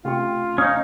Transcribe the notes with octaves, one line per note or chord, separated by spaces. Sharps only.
C3 A3 C#4 F4 G4 G5
C#4 D#4 F5 D#6